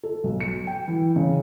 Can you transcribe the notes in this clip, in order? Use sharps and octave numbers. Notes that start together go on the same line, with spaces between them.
A4
B1
C#7
G5
E3
C#3